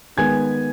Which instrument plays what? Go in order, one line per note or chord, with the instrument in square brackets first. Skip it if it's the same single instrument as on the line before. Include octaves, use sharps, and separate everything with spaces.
[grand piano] D#3 G#3 B3 G#5 G#6